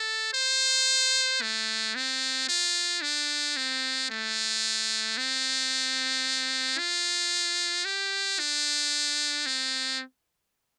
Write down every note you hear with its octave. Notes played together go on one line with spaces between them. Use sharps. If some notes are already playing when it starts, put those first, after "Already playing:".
Already playing: A4
C5
A3
C4
F4
D4
C4
A3
C4
F4
G4
D4
C4